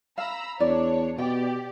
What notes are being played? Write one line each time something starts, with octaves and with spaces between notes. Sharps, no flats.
F5 A#5 B5 E6
E2 D4 C#5 D5
B2 G4 D5 G5